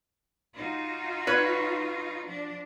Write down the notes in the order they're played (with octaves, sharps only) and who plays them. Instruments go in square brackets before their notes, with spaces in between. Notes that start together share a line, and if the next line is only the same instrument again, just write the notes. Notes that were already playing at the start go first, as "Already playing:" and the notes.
[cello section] D#4 F4 F#4
[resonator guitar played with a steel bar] B4 C#5
[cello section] F3 D4